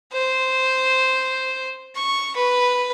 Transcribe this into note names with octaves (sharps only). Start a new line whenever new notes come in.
C5
C#6
B4